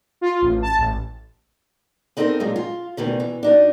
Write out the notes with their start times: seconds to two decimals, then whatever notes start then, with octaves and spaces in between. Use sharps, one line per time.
0.21 F4
0.42 A1
0.62 A5
0.78 A1
2.17 B3 C4 D#4 A4 A#4 C5
2.40 A#2 F3 F#3 G#3
2.56 F4
2.97 D2 B2 D#3 E3
3.20 E3
3.43 D4 D#4 F#4